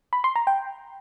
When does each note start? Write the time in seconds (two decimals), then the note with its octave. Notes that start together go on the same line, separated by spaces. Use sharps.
0.13 B5
0.24 C6
0.36 A#5
0.47 G5